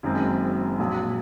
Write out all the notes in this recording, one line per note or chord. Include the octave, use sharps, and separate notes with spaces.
F#1 F#2 D#3 G#3 C4
A#1 A#2 F#3